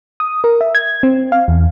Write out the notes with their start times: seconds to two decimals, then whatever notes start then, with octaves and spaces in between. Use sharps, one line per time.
0.20 D#6
0.44 A#4
0.61 E5
0.75 G#6
1.03 C4
1.32 F5
1.48 E2